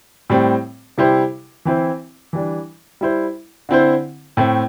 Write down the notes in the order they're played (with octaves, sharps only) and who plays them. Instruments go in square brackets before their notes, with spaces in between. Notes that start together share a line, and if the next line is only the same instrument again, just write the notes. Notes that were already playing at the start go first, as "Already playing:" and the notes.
[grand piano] A2 G3 C4
C3 G3 E4 G4 C5
E3 C4 E4 C5
E3 G3 D4
G3 E4 C5
D3 C4 E4 C5
A2 A3 C4